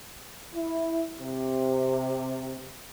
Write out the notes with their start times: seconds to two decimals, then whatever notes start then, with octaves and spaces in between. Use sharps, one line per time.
0.55 E4
1.20 C3